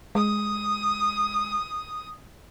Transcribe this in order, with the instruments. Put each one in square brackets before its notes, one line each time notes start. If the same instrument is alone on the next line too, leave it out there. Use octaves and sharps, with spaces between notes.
[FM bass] G#3 [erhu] D#6